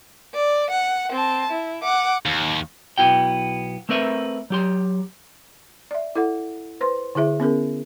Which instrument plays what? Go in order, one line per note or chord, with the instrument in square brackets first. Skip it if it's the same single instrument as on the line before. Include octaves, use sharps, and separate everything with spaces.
[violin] D5
F#5
C4 A5
E4
F#5 D6
[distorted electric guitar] D#2
[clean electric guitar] B1 B3 E4 F#4 G5
A3 C4 A#4 B4 E5
F#3 G4 C6
[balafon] D5 E5
E4 A4 F#5
B4 C5 C6
D3 E4 G#4 E5
B3 C#4 G#4 A#4